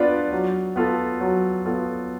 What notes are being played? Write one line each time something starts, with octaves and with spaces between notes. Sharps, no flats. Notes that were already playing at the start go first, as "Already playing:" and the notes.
Already playing: B3 D4 F4 B4 D5
F#3
B3 F4 A4
F#3
B3 F4 A4